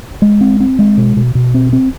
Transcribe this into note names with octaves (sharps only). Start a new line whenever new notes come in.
G#3
C4
C4
G#3
B2
B2
B2
C4
C4